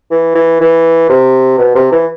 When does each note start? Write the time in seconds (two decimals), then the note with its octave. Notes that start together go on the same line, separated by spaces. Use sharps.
0.11 E3
0.35 E3
0.61 E3
1.09 C3
1.58 B2
1.75 C3
1.91 E3